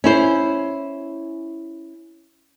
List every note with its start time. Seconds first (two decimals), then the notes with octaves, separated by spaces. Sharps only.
0.04 C#4 E4 C5